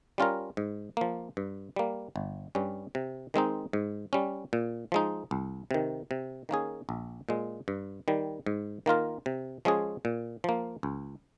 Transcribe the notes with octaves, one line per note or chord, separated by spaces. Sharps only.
G3 C#4 F4 A#4
G#2
F3 A#3
G2
G3 A#3
G1
G2 G3 C#4
C3
D#3 G#3 C4 D#4
G#2
G3 C#4
A#2
F3 G#3 D#4
C2
C3 D#3
C3
D#3 A#3 C#4 G#4
A#1
A#2 G#3
G2
D#3 G3
G#2
D#3 A#3 F4 A#4
C3
F3 G#3 C#4 G#4
A#2
F3 A#3
C#2